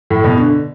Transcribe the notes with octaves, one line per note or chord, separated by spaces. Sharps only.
A2
B2
D3